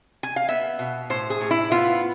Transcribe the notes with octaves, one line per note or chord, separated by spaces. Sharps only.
G#5
F5
B3 E5
B2
A2 C5
G#4
A2
E4
B3 F4